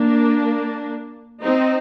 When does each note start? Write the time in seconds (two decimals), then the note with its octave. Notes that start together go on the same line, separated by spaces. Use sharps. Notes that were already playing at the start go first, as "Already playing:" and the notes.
Already playing: A#3 D4
1.43 C4 D#4